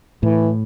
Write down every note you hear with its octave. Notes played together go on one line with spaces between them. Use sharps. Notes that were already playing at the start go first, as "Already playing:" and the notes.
A2 E3